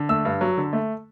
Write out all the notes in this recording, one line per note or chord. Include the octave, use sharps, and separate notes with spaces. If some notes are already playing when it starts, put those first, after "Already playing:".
Already playing: D3
A3 E6
G2
F#3
D3
A3